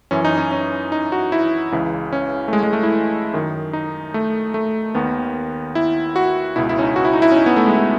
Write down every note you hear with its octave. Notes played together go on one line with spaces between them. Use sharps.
F#2 E3 C#4
D#4
C#4
C#4
D#4
F#4
E4
C#2 C#3 E3
C#4
A3
G#3
G#3
A3
E4
F#2 D#3
D#4
A3
A3
D#2 D#3 B3
E4
F#4
C#2 B2 E4
E4
C#4
D#4
F#4
E4
D#4
E4
C#4
D#4
B3
A3
G#3
A3